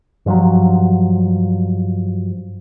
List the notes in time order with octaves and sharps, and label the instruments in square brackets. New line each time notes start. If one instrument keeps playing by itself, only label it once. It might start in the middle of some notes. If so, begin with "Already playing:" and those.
[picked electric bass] G2 F3 F#3